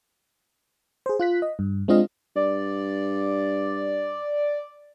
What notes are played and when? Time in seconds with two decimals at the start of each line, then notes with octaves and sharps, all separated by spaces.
1.06 G#4 C5
1.20 F4 F#6 B6
1.42 D#5
1.59 G2
1.88 G#3 C4 D4 F4 D#5 F5
2.36 G2 D5